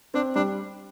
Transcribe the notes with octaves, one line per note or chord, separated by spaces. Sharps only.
C4 D4
G3 D4